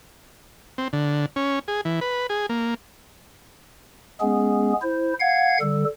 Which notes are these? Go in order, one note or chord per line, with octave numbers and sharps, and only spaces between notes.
C4
D3
C#4
G#4
E3
B4
G#4
A#3
G#3 B3 C#4 G#4
E4 C5
F5 F#5 G#6
D3 G3 A4